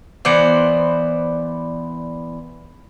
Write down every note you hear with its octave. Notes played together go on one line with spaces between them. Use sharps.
E3 B3 C5 D5